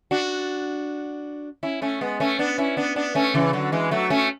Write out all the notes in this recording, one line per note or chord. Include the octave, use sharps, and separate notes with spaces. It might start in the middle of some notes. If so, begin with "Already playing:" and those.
D4 F#4
C#4 E4
A3 C#4
G#3 B3
A3 C#4
B3 D4
C#4 E4
B3 D4
B3 D4
A3 C#4
C#3 E3
D3 F#3
E3 G#3
F#3 A3
A3 C#4